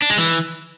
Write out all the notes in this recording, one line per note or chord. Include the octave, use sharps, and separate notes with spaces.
D4
G#3
E3